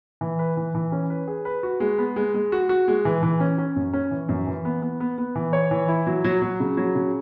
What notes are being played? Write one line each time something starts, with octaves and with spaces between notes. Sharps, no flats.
E3
B4
E3
E3
C#4
B4
G#4
B4
F#4
G#3
B3
G#3
G#3
F#4
F#4
G#3
E3
E3
C#4
C#4
F#2
C#4
E3
F#2
E3
B3
B3
B3
B3
E3
C#5
E3
E4
F#3
F#3
F#3
C#3
F#3
C#3